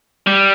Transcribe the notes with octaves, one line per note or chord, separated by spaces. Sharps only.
G3